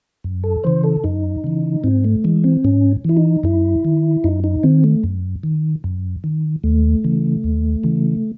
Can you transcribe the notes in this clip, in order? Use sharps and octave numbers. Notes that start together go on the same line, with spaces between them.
F#2
A4
C#3 E3 C5
A4
F#2 D#4
C#3 E3
G#2 C4
A3
E3 G#3
C4
G#2 C#4
E3 E4
D#4
F#2 E4
D#3
F#2 D#4
D#4
D#3 C4
A3
F#2
D#3
F#2
D#3
D#2 A3
C#3 E3
D#2
C#3 E3